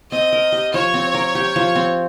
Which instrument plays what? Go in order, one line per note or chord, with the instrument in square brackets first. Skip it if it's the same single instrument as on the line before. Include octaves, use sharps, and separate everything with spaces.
[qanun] C4 [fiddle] D#5
[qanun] A#4
G4
[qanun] F3 [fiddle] C#5
[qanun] C4
A#4
G4
F3
C4